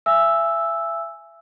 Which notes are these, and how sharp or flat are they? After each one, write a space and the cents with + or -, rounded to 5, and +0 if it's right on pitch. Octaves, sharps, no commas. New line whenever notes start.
E5 +30 G#5 +0 E6 +0